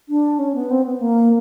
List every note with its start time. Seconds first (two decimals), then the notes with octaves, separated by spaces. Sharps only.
0.09 D4
0.39 C#4
0.55 B3
0.71 C4
0.86 B3
1.01 A#3